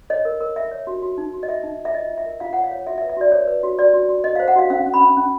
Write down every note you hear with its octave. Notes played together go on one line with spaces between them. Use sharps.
C#5 D#5
A#4
A#4
A#4 E5
C#5
F#4
F#4
D#4
F#4
D#5
F#4 E5
D#4
D#4
E5
F4 D#5
F4
E5
A#4
F4 F5
C#5 F#5
F5
C#5
F#4 E5
E5
B4
E5
F#4 D5
B4 C#5
B4
F#4
F#4 D5
F#4
F#4
F#4 D#5
F5
C5
F#5
F#4 F5
C#4 F5
C#4
B5
C#4
C#4